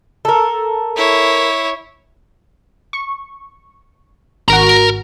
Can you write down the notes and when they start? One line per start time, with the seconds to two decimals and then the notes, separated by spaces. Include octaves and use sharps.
0.25 A4 A#4
0.96 E4 C#5
2.93 C#6
4.48 G#1 F#4 A#4 A#5